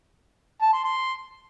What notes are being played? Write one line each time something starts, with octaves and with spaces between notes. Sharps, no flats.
A5
C6
C6